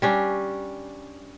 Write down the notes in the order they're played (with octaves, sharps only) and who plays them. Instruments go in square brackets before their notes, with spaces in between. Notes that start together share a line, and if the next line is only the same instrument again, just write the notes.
[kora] G3 C#4 D4